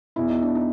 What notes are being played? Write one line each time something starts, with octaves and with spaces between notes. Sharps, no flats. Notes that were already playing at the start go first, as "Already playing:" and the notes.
E2 B2 E4
D#4
D4
D#4